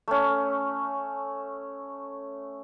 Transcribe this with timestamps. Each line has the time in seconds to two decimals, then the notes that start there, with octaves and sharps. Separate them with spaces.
0.08 A3 C#4